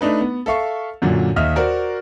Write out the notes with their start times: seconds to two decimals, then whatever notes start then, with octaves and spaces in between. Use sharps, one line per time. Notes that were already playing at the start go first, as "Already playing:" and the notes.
0.01 A3 D4 D#4 B4
0.21 B3
0.46 A4 E5 F5 C#6
1.02 F#2 A#2 D3 F#3
1.36 D#2 D#5 E5 F6
1.56 F#4 A#4 C5 D5